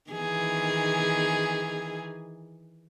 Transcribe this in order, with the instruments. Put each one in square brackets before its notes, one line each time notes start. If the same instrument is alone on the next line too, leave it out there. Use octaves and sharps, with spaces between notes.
[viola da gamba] D#3 E3 G#4